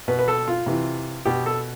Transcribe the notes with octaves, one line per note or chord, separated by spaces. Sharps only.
B2 B4
B4
A4
F4
C3 E3
B2 G4
A4